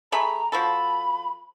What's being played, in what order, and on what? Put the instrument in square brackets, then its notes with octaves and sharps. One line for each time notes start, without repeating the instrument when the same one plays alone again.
[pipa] A3 G#4 B5 [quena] A#5
[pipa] F3 F#4 A4 [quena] B5